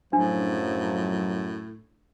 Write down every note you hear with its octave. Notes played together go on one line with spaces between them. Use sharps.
F#2 A2 F3 F#3 D4